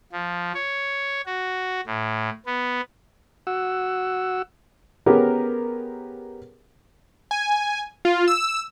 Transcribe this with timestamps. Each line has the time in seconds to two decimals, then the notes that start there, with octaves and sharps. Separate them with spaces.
0.12 F3
0.54 C#5
1.26 F#4
1.87 A2
2.46 B3
3.47 F#4 F#5 E6
5.06 B3 C#4 G4 G#4 A#4
7.31 G#5
8.05 F4
8.28 E6